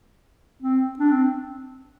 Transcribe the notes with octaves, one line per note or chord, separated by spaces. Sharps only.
C4
D4
C4